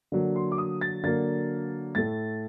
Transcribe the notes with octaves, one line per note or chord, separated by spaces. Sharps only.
D3 F#3 A#3
C6
D6
D#6
A6
D3 F#3 A#3 A6
A2 A3 A6